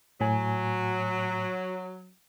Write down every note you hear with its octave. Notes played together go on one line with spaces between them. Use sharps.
A2 F#3 G#5